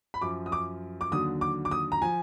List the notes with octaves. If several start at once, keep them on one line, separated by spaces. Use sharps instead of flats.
B5
F#2 F3 D6
D#6
D6
D6
D#2 D3 F#3 D#6
D6
D6
D#6
A#5
F3 G#5